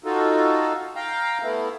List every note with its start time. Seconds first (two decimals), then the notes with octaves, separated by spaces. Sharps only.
0.05 D#4 F4 F#4 A4
0.96 F5 G5 A#5
1.43 A3 B3 E4